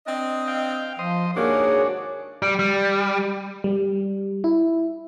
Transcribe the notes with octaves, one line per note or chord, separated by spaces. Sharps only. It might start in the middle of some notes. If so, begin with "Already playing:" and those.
C4 D4 D#5
F5 G5
F3 C5 D#5
D#2 G#2 A#3 D4 F#4 G#4 C#5
G3
G3
G3
E4